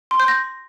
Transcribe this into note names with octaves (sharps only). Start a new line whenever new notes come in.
C6
G6
A#6